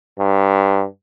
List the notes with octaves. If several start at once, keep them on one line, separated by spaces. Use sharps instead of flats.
G2